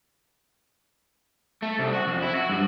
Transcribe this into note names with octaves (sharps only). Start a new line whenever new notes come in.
A3
C2
F#4
F2
E4
F#4
G2